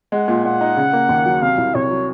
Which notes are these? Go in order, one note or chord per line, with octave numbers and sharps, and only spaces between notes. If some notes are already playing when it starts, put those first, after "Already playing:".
G#3 F#5
A#2
A#2 F#5
D#4
C#3
A#3
D#2
F#3
C3 F5
C2
C2 C#5
F#3